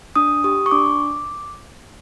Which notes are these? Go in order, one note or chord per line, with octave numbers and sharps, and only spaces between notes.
D4 D#6
G4 D#6
C#6
D4 D6